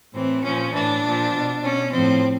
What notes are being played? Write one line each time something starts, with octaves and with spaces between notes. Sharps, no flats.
A2 E3 C4
A#2 F3 C#4
A2 E3 D4
A#2 F3
B2
B2 C#4
F3 C4
A2